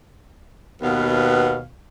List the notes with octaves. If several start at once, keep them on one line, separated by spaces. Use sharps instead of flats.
D#2 B2 B3 F5